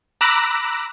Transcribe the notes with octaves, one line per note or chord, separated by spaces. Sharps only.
A#5 B5 D6 E6 F#6 A#6